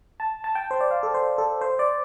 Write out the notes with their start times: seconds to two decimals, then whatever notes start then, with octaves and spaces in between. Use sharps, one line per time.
0.20 A5
0.44 A5
0.55 G5
0.71 C5
0.81 D5
0.91 F5
1.03 A4
1.14 C5
1.38 A4
1.61 C5
1.79 D5